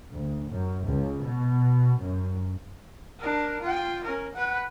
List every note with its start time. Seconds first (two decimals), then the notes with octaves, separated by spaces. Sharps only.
0.12 D2
0.49 F#2
0.88 C#2
1.26 B2
2.00 F#2
3.19 D4 A#4
3.62 F4 G5
4.04 C#4 A#4
4.35 B4 F#5